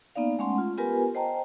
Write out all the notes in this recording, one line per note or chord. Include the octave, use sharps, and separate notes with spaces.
A#3 B3 D#4 D5 F5
G#3 A3 C#4 F#5 C6
F4
B3 F4 G4 A#4 B4 G#5
C5 D#5 G5 A5 A#5